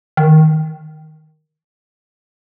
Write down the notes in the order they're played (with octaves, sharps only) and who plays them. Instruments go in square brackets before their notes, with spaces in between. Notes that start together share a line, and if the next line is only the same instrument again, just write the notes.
[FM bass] D#3